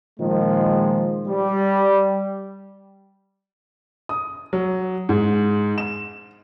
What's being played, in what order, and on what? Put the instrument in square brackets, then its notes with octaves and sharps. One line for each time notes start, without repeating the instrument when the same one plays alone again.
[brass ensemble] A#2 D#3 F3 G#3
G3
[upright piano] D#6
F#3
G#2
E7